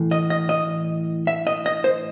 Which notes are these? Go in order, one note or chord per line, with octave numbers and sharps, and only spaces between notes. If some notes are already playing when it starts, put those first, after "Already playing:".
Already playing: A2 E3 A3
D#5
D#5
D#5
E5
D#5
D#5
C5